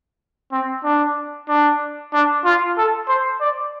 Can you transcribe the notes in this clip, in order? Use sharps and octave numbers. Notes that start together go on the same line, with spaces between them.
C4
D4
D4
D4
F4
A4
C5
D5